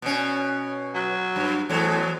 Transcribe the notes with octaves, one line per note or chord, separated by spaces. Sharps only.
B2 C#4
F#3
G2
E2 A2 F#3